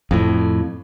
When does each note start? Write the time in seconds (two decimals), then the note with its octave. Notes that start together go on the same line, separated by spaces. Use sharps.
0.11 F2 A2